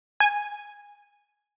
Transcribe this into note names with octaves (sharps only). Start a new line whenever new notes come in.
G#5